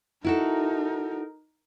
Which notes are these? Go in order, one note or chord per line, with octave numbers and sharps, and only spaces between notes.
D#4 E4 F#4 A4 A#4